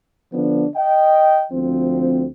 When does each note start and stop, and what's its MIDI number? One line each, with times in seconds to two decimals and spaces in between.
0.34 0.66 50
0.34 0.66 53
0.34 0.66 59
0.34 0.66 62
0.76 1.44 75
0.76 1.44 79
1.52 2.27 38
1.52 2.27 53
1.52 2.27 60